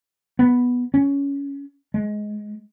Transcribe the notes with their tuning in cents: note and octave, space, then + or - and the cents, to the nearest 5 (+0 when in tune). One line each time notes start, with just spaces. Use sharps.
B3 -5
C#4 +15
G#3 +15